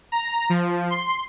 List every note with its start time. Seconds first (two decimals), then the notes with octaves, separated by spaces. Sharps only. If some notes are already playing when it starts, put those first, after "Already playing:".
0.12 A#5
0.50 F3
0.90 C6